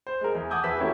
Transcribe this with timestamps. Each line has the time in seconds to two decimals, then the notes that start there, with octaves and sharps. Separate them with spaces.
0.07 C5
0.21 G#3 A#4
0.35 E2
0.50 F#5 A5 D6 D#6 G6 G#6
0.64 E2 B4 A5 E6 B6
0.79 A#3 C#4 E4 F#4 G4 A4